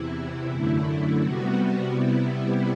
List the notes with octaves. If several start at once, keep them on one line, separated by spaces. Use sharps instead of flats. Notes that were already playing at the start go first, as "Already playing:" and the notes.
Already playing: E2 C3 E3 E4
F#2 D3 A3
C3 G3 B3 F#4
C3 G3 B3 E4